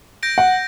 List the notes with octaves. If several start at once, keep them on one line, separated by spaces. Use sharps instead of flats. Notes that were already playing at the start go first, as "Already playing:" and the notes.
G6 A#6 D7
F#5